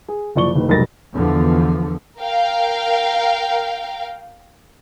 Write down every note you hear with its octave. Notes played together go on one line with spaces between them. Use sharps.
G#4
F#1 F3 D5 C#6 G7
F#1 D#3 B4
F1 B1 G3 A#4 A6 A#6
E2 D3 F3
A#4 F5 G5